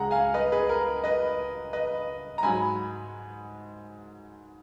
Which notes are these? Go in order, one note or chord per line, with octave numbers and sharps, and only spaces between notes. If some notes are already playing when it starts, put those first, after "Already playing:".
Already playing: C#2 C#3 G#3 F#5 A#5
F5 G#5
B4 D#5
G#4 B4
A#4
B4 D#5
B4 D#5
A#5
G#2 F#3 G#5 B5